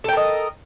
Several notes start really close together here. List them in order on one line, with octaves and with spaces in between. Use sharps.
A4 G5 A#4 D#5